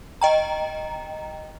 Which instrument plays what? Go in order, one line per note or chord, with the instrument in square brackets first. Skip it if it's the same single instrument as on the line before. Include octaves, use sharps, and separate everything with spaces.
[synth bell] D#5 G5 A#5